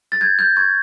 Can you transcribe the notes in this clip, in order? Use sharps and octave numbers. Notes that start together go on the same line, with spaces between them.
A6
G6 G#6
G6
C#6 G#6